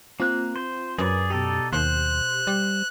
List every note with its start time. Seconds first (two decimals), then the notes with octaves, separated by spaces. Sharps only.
0.20 A#3 C4 F4 F#6
0.56 C5
0.99 F#2 G#4 A#4 B4 D5 A#5
1.30 B2 D#4 G4 A4 D5
1.73 D#2 C5 F#6
2.47 G3